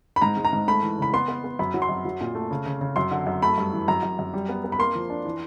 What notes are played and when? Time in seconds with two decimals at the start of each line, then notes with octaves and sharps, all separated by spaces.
0.16 B5
0.22 G#2 A#5
0.37 G#3
0.45 A#5
0.53 G#2
0.68 A3 B5
0.82 E3
0.99 C#3 B5
1.13 B3 C6
1.28 B3
1.44 B3
1.59 F#2 B5
1.74 F#3
1.82 C6
1.89 F#2
2.05 F#3
2.21 A#2
2.35 A3
2.51 C#3
2.66 C#3
2.81 C#3
2.96 F#2 C6
3.11 D3
3.27 F#2
3.42 A3 B5
3.58 G2
3.73 E3
3.88 F#2 A#5
4.03 F#2
4.19 F#2
4.34 G3
4.49 B3
4.64 B3
4.72 B5
4.79 A#3 C6
4.95 F3
5.10 D4
5.25 E3